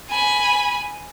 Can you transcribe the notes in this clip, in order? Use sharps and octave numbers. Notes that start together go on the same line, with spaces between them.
G#5 B5